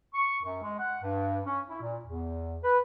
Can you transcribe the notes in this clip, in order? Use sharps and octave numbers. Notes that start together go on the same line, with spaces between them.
C#6
F#2
G#3
F#5
G2
C#4
E4
A#2
E2
B4